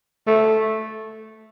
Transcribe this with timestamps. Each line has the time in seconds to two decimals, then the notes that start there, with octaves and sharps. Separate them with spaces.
0.27 A3